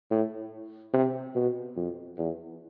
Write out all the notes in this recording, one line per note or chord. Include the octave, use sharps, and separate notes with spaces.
A2
C3
B2
F2
E2